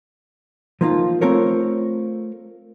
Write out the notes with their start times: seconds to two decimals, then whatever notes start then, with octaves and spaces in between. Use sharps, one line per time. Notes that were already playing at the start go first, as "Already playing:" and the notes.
0.81 F3 A#3 D#4 F4
1.21 A3 C4 F4 A#4 C#5